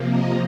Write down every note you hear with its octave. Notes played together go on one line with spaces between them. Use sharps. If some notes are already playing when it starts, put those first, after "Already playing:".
Already playing: C3 F3 A#3
A#4 D#5